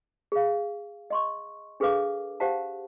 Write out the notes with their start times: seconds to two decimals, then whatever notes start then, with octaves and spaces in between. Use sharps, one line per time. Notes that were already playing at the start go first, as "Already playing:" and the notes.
0.32 G#4 F5
1.10 D#5 C6 C#6
1.80 D4 G#4 A4 B4 F5 D6
2.40 G4 C5 F5 F#5 A5